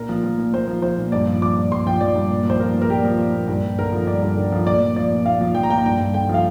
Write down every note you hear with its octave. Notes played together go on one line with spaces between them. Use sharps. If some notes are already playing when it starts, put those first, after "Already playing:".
Already playing: A#2 A#4
F3
F3
A#2
A#2 C5
F3
F3 C5
A#2
G2 D5
F3
F3 D6
G2
G2 C6
F3 G5
F3 D5
G2
A#2
F3 C5
F3 A#4
A#2
A#4
A#2 G4
F3
F3
A#2
G2
G2
D3 A#4
F3
G2 D5
G2
D3
F3
A#2 D5
F3
F3 D5
A#2
A#2 F5
F3
F3 G5
A#5
A#2 G5
A#5
G2 G5
G2
D3 G5
F3 F5